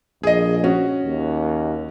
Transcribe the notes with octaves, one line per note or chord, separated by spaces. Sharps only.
A#1 G#4 D#5
C#4 F#4
D#2